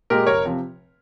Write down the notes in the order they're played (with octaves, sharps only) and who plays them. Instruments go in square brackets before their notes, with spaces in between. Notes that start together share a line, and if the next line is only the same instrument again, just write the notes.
[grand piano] A#2 G#3 G4 A#4
F1 A#4 C#5
C3 F3